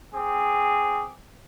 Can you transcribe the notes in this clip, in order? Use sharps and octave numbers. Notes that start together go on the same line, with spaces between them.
C4 G#4 D6